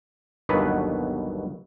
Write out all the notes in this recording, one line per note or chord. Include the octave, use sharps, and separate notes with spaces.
G1 D#2 B2 F#3 B3 B4